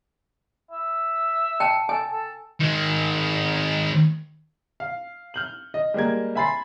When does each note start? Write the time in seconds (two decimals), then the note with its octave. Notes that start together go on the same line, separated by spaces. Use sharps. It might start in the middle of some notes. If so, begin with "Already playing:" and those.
0.71 E5
1.60 G5 A5
1.89 A4 G#5
2.12 A4
2.60 D#3 G#3
4.80 F5
5.34 F6 G6 F#7
5.74 D#5
5.94 G3 G#3 A#3 G#6
6.35 E5 G#5 B5 C6 A6 C7